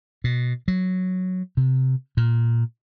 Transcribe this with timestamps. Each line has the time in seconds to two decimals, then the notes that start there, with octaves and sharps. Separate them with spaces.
0.24 B2
0.68 F#3
1.57 C3
2.17 A#2